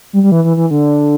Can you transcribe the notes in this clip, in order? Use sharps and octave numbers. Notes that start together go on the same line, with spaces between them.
G3
G3
E3
E3
E3
D3